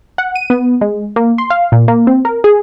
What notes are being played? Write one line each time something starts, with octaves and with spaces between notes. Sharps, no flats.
F#5
D#7
B3
G#3
A#3
C6
F5
A#2
A#3
C4
A#4
G#4